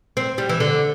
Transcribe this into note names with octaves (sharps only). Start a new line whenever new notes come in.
C4
G3
E3
D3